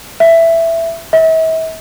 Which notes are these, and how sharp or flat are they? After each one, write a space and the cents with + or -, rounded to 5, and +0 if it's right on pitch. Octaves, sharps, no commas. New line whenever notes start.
E5 +10
E5 -40